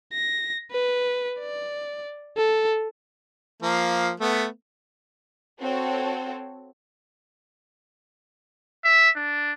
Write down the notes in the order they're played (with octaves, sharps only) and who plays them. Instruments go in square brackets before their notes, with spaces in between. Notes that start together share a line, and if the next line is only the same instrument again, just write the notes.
[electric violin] A#6
B4
D5
A4
[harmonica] F3 A#3
A3 B3
[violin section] C4 F#4 A4 C#5
[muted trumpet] E5
D4